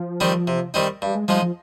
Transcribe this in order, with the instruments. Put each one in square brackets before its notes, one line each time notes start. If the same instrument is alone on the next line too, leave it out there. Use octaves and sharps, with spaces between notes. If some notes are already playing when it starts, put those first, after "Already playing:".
Already playing: [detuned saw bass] F3
[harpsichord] D#3 G3 C4 D#4
C3
D#3 G3 C4 D#4
[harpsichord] G2 [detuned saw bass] G3
[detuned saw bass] G#3
[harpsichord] F3 G#3 D#4 [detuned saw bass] G3
[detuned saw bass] F3